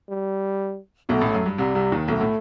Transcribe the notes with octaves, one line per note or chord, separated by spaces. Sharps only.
G3
B1 B2 A3
A1 A2
F#2
G2
C2 C3 G3
C2 C3
D#2 D#3
B1 B2 A3
A2